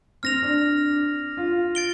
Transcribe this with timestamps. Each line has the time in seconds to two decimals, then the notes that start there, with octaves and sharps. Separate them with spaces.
0.23 C4 F6 A#6 F7
0.42 D4
1.37 F4
1.75 A6 D7 G7